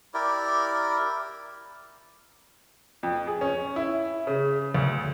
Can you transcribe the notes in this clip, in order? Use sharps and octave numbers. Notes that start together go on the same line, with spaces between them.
E4 G4 A#4 D5
F2
G#4
C#4
E4
C#3
D2